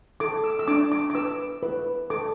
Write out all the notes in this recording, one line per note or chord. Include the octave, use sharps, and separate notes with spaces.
A4 D6
E6
E6
D4 D6
D6
D6
B4 E6
B4
A4 D6